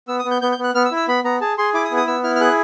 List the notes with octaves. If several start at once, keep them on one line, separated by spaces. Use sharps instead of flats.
B3 E6
D#6
B3
G6
B3 G6
G6
B3
F#6
B3 F6
E6
E4
E6
B3 B5
B3 A#5
G#4 A5
G#4 C6
E4 D6
D#6
B3
D#6
B3 E6
E4 F6
F6
G#4 F#6